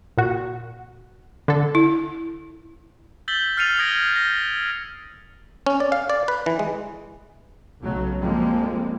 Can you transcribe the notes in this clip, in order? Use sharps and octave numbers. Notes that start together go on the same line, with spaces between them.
A#2 F#4
D3 A4
E4
E6 G6 A6 B6 F#7 G7
F6 A6 C7 C#7 D#7 F7
D#6 G#6 A#6 D7 F7 G7
G6 A#6
C#4
D5
F5
D5
B4
E3
G#3
B1 C#3 F#3 A3
F2 F3 G3 G#3 A#3 C4